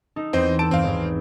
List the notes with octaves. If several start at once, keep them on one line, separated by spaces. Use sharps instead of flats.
D#4 A4
E2 C4 C5 D#5 G5 C6
C4 A4 A5 D7
E2 G2 C4 F5
G#1